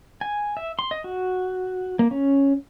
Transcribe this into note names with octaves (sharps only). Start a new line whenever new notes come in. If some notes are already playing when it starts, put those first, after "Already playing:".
G#5
E5
C6
D#5
F#4
A#3
C#4